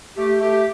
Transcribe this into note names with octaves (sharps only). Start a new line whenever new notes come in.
A3 G4
A3 G4